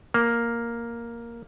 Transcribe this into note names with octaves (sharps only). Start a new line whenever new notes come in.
A#3